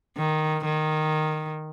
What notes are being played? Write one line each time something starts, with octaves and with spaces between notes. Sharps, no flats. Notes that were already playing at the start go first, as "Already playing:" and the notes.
D#3
D#3